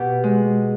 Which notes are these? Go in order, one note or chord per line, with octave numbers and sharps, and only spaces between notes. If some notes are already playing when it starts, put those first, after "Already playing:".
Already playing: B2 G4
G#3